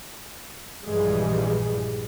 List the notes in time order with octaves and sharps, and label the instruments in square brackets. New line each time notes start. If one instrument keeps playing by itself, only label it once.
[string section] A#1 G2 E3 F3 G3 G#3